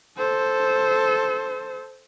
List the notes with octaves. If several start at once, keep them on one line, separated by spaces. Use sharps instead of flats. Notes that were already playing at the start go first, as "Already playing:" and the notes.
A4 C5